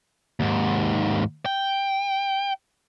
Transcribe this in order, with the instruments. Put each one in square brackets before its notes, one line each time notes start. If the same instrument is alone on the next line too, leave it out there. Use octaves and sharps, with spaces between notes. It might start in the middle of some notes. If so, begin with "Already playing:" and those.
[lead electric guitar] D#2 G#2
G5